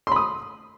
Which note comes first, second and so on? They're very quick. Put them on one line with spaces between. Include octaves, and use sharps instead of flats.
C6 B5 D#6